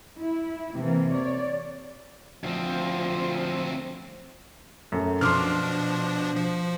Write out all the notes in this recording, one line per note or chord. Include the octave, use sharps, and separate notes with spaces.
E4
C3 E3 A#3
C#5 D5
D2 F3 C4
F#2 A3
B2 F3 D4 C6 D6 F6
F3